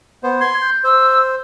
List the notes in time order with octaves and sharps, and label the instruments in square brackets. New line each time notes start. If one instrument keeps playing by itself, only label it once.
[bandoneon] B3 C5
[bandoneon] C6 [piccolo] G#6
[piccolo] G6
[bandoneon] C5 [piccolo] E6